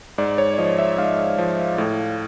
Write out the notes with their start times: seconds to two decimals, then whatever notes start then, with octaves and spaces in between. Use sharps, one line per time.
0.18 G#2 D5
0.38 C#5
0.53 D5
0.58 F3 D#5
0.78 E5
0.98 G#2 F5
1.38 F3
1.78 A2